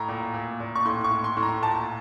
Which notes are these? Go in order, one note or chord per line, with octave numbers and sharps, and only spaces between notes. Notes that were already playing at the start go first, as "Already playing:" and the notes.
Already playing: A2 A#5
A#2
A#2
A#2
C#6
A2 C6
C#6
A2
C6
A2
A#5
A#2 A5